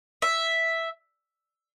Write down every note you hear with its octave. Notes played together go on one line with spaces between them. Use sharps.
E5